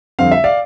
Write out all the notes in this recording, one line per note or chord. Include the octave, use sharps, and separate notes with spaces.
F2 D3 G3 C4 F5
E5
D5 F5